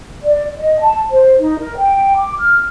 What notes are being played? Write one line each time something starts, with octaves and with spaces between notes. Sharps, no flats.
D5
D#5
A5
C5
D#4
A#4
G5
D6
F6